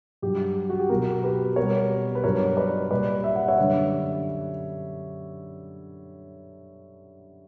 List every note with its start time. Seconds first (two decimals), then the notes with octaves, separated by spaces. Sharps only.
0.22 G2 F#3 G4
0.69 F#4
0.79 G4
0.89 B2 F#3 F#4 A#4
1.23 G4 B4
1.56 B2 G3 A#4 C#5
2.15 B4
2.24 G2 F#3 A#4 C#5
2.57 B4 D5
2.91 A#2 G3 B4 D5
3.24 E5
3.36 F#5
3.48 C#5 E5
3.58 F#2 D3 G3